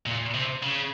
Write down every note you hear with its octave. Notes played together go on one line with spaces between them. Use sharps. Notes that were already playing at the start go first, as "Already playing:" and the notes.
A#2
C3
C#3